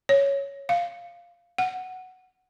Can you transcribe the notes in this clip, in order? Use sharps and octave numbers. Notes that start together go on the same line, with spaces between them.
C#5
F5
F#5